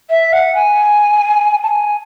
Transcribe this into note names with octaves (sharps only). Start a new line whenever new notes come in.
E5
F#5
G#5
A5
G#5